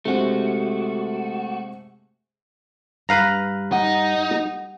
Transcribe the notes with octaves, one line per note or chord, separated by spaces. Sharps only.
C3 G#3 A3 F#4
G2 B4 F5 A#5
D#4 F#5